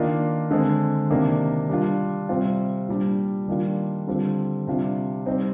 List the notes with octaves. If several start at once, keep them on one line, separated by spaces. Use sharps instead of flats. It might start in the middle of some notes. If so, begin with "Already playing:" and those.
Already playing: D#3 A#3 D4 F4
D3 G#3 C4
C3 D#3 A#3 D4
G3 D4 F4
C3 G3 C4 F4
A#2 G3 D4
D#3 G3 A#3 D4 F4
D3 G3 C4 F4
C3 G3 D4 F4
G3 C4 D#4